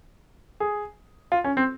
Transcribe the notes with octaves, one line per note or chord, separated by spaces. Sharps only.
G#4
F4
C#4
C4